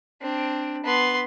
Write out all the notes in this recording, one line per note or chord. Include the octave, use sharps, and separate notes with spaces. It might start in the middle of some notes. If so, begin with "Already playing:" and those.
C4 D4
B3 C6